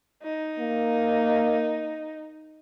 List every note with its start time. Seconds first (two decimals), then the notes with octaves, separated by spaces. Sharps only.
0.23 D#4
0.59 A#3